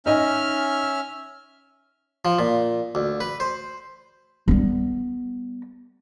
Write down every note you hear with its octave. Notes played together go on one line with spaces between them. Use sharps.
C#4 D#4 D#5 E5 G#5 F6
F3
A#2
D2
B4
C5
G3 B3